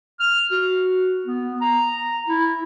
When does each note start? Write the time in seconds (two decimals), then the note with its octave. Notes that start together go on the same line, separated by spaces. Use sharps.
0.20 F6
0.51 F#4
1.26 B3
1.61 A#5
2.28 E4